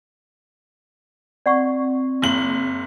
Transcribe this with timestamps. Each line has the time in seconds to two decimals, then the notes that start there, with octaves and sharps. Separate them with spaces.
1.46 C4 D5 F#5 C#6
2.22 F#1 F#7